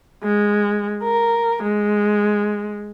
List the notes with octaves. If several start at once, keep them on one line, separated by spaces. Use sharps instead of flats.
G#3
A#4
G#3